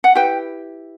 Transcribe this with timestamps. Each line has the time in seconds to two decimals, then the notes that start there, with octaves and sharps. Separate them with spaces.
0.04 F#5
0.15 E4 G4 B4 G5